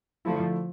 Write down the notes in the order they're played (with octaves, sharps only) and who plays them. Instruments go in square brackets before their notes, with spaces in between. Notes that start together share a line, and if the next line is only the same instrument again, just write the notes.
[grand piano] D3 A3 E4 [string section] F3